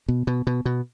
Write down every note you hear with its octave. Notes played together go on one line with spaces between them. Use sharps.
B2
B2
B2
B2